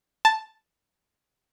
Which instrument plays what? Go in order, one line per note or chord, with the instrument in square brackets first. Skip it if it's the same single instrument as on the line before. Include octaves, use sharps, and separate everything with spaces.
[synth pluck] A5